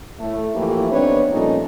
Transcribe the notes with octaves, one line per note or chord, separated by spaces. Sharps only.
A2 A3
E3 F3 A3 A#3 E4 G4
B3 C4 D4 D#4 B4 C#5
A#2 F3 G3 A3 C#4 D#4